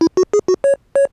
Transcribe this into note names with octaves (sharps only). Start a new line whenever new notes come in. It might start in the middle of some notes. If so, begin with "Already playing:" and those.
E4
F#4
G#4
F#4
C#5
C#5